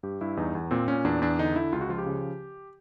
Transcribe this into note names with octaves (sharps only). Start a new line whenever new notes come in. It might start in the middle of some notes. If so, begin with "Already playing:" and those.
G2 G4
G2 E4
E2 D#4
E2
A#2 C4
A#2 C#4
E2 D4
E2 D4
D3 D#4
D3 E4
C#2 F4
F#4
F3 F4
G4
C#3